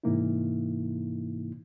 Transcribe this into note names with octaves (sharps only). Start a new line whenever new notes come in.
G#2 C3 E3 A#3 D#4 E4